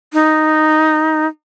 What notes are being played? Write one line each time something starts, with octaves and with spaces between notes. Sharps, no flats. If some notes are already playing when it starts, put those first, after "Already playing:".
D#4